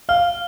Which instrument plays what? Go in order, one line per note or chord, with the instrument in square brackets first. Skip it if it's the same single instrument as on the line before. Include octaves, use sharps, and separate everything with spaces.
[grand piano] F5 [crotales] F6